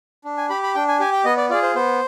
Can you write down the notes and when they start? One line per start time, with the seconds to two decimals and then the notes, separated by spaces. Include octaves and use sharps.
0.25 D4
0.37 G#5
0.50 G4 B5
0.63 B5
0.75 D4 G5
0.88 G#5
1.00 G4 G#5
1.12 G5
1.25 B3 D#5
1.37 D5
1.50 F4 G#4 D5
1.63 C5
1.75 B3 C5